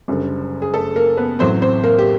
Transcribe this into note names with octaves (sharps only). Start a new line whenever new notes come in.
F#1 F#2 D3 G3
G#4
A3 A4
A#3 A#4
B3 B4
A1 A2 F#3 A3 C4 C5
C4 C5
A#3 A#4
G4